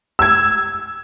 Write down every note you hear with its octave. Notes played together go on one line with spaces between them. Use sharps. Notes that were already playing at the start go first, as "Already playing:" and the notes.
E6 G#6